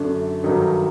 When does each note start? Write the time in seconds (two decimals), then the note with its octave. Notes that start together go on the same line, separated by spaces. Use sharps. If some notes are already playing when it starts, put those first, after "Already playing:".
Already playing: F#2 D3 A3 D4
0.43 G2 D#3 F#3 A3 D#4